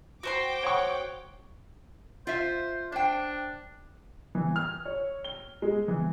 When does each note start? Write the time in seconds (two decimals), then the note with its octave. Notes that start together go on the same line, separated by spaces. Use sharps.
0.23 F#4 C5 G5 C6 D6
0.63 C#5 F#5 C#6
2.27 F4 C5 E5
2.92 D4 C5 G5
4.35 E3
4.56 F6
4.85 C#5
5.25 G7
5.62 G#3
5.88 E3